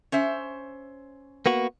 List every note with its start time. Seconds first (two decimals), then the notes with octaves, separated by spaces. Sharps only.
0.12 C#4 C5 E5
1.46 A#3 B3 F#4